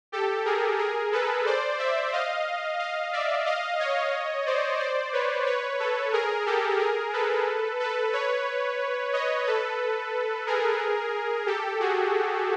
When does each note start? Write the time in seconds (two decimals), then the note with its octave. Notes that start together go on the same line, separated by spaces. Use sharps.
0.12 G4 A4
0.45 G#4 A#4
0.79 G#4 A#4
1.12 A4 B4
1.46 C5 D5
1.79 D5 E5
2.13 D#5 F5
2.79 D#5 F5
3.13 D5 E5
3.46 D#5 F5
3.79 C#5 D#5
4.46 C5 D5
4.79 C5 D5
5.13 B4 C#5
5.46 B4 C#5
5.80 A4 B4
6.13 G#4 A#4
6.46 G4 A4
6.79 G#4 A#4
7.13 A4 B4
7.80 A4 B4
8.13 B4 C#5
9.13 C#5 D#5
9.46 A4 B4
10.47 G#4 A#4
11.47 G4 A4
11.80 F#4 G#4